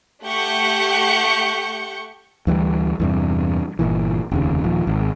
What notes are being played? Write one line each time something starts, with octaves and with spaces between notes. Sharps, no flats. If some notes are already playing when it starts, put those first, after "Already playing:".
A3 G4 F#5 C#6 G6 C#7
D2 E3 F#3 G3
E2 G2 C3
G1 C2 A#2 E3
F1 D#2 C#3
D#1 F3
G#1